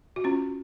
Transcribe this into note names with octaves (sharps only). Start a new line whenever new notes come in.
F#4
C#4 F4